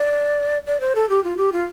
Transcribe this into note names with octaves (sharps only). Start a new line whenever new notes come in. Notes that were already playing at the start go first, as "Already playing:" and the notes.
Already playing: D5
D5
C5
A4
G4
F4
G4
F4